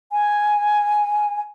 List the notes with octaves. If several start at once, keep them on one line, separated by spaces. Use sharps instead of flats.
G#5